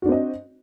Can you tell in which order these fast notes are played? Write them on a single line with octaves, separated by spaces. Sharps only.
F#4 D4 C4 D#5